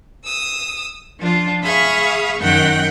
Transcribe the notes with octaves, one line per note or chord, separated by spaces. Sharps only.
D#6 E6
F3 D4 F4
G#4 E5 F5 B5 C#6 D#6
F#2 D#3 F#5 G5 F#6